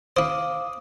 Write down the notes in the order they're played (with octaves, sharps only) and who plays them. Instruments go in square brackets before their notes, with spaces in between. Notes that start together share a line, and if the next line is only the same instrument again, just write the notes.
[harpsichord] E4 C5 [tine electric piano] F5 D6 D#6